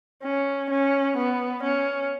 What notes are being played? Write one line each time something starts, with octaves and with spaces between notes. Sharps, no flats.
C#4
C#4
B3
C#4